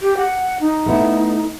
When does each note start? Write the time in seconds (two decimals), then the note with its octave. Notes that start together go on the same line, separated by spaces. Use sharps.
0.02 G4
0.17 F#5
0.60 D#4
0.86 A3 B3 E4